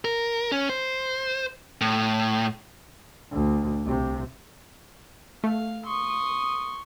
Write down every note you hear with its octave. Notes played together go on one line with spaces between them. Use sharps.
A#4
C#4
C5
A2
D2
C2 C3
A3 F5
C6 C#6 D#6